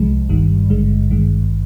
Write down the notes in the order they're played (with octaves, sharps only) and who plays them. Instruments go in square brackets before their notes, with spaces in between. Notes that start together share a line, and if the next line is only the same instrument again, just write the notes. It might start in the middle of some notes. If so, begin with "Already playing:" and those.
Already playing: [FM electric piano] C2 C3 F3 G#3
G1 G2 D#3 G3
G#1 G2 D3 G#3
G#1 G2 D#3 G#3